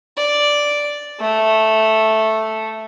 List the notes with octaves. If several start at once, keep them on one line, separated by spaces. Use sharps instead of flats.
D5
A3